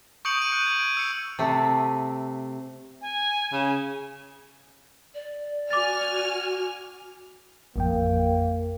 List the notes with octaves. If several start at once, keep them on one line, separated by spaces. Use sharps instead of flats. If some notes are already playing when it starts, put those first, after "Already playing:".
C#6 D#6 G6 C#7 D7 F#7
G6 D#7
F#6 G6 C#7 F#7
G#6
D7
E6 C#7
C3 A3
G#5
C#3
D5
F#4 G#5 D6 F6 A6
A1 F2 A#3 G5